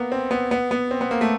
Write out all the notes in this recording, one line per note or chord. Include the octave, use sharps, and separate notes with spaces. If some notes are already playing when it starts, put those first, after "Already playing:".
Already playing: A#3 B3
C4
B3
B3
B3
C4
B3
A#3
A3